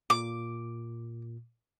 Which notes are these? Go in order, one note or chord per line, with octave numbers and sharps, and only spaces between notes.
A#2 D6